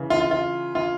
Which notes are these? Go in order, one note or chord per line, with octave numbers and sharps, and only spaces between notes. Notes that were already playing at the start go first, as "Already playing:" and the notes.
Already playing: C#3 E3
F4
F4
F4
F4